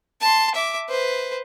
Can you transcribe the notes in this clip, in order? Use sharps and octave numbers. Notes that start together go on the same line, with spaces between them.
A5 C6
E5 D6
B4 C5